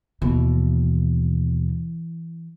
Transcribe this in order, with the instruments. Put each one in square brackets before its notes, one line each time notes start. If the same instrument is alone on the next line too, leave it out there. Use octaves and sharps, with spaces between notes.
[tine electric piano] D#2 B2 [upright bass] E3